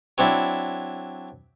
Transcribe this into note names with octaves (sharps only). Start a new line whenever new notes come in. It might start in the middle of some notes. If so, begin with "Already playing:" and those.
F#3 C4 D4 E4